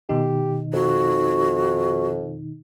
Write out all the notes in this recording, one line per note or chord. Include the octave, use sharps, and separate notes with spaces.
B2 D#3 D#4 G4
F2 F#4